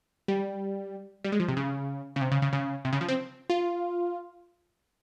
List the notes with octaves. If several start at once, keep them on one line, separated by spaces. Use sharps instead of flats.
G3
G3
G#3
F3
C3
C#3
C#3
C3
C#3
C#3
C#3
C3
C#3
F3
C4
F4